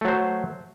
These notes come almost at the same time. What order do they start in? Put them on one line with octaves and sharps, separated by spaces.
A3 F#3 C5